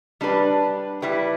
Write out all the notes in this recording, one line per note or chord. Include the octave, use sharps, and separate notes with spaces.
G3 D4 G4 B4
G3 E4 G4 B4